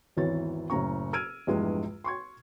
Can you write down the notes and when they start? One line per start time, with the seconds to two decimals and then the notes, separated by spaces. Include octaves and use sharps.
0.17 G#1 E2 E3 C#5 A6
0.70 F#1 A2 C#4 A#5 C#6
1.13 E6 F6 G#6 D7 D#7
1.47 A#1 E2 G2 E3 G#3
2.04 C6 C#6 G#6